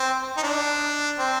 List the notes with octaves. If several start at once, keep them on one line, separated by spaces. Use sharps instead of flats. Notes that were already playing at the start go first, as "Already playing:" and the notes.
Already playing: C4
D#4
D4
C4